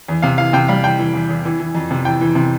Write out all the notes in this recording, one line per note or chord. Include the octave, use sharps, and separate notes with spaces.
E2
C3 F5
E3 F5
C3 G5
G3 F5
E3 G5
E3
E2
E2
E3
E3
F2
C3
E3 G5
E3
C3